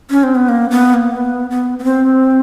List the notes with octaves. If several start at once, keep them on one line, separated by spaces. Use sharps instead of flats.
C#4
C4
B3
A#3
B3
A#3
B3
B3
B3
C4